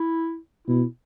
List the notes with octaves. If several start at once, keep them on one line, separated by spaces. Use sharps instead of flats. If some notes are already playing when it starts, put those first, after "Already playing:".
Already playing: E4
B2 E4